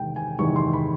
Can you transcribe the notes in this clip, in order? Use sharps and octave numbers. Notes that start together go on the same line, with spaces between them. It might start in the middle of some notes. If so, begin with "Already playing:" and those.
Already playing: E2 C3 D#3 G#3 G5
G#5
E2 C3 D#3 G#3 C#6
C6
B5